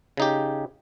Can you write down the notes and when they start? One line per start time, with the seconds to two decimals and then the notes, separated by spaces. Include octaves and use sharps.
0.17 C#3 D#4 G4